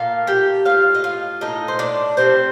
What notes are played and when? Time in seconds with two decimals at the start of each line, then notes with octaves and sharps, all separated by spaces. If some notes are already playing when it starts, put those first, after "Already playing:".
Already playing: A#2 A3 F4 F5
0.27 G4 G5
0.65 A2 G3 F4 F5
0.94 D#5
1.04 F4 F5
1.41 A2 A3 D#4 D#5
1.68 C5
1.79 D4 D5
2.17 C3 G3 C4 C5